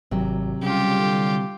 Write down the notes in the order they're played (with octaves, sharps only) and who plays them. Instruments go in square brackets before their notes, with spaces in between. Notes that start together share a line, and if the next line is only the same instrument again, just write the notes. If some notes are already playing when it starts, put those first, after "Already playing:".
[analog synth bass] G#1 [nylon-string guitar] C3 F#3
[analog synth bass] C#3 [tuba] G3 [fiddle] F4 G4
[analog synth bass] D3